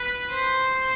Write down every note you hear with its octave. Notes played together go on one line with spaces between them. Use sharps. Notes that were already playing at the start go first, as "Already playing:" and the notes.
Already playing: B4
C5